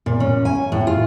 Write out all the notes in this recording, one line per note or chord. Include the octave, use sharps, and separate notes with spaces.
A#2
C#4
G#5
A2
F4